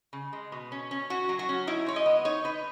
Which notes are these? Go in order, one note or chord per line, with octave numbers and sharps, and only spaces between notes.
C#3
G#3
B2
C#4
C#4
C#4 F#4
F#3
F#4
C#4
D#4 E4
G#3 C#5
D#5
B3
D#4 C#5
D#4 B4